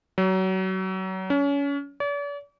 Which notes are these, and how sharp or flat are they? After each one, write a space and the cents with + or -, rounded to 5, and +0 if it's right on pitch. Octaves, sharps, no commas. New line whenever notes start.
F#3 +30
C#4 +30
D5 -45